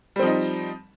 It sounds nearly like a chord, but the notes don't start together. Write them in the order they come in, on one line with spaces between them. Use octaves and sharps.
G3 C4 F3 D#4